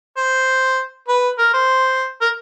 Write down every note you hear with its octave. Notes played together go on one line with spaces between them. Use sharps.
C5
B4
A#4
C5
A#4